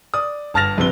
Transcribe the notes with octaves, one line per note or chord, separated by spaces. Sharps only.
D5 D#6
G1 A5 F6 A6 A#6 F7
A#1 C3 B4 G7